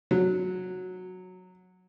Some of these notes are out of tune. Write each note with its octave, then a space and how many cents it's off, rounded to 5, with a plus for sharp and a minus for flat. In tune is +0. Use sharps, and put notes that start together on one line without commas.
F#3 -10